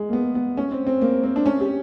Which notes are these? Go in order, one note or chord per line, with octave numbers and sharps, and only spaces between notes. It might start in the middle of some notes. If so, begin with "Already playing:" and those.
Already playing: G#3
A#3
B3
B3
C#4
C4
C4
A#3
C4
D4
C#4
G4